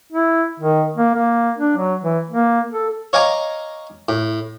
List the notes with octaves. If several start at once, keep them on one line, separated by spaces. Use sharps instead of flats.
E4
D#3
A#3
A#3
D4
F#3
E3
A#3
A4
C#5 D#5 F5 G#5 A#5 D6
A2